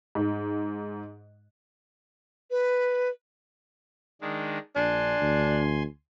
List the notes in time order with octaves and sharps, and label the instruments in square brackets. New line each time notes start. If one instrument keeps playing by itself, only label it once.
[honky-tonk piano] G#2
[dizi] B4
[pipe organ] D#3 G#3 D4
[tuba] A#1 [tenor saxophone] D4 [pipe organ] G#5 C6
[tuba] D2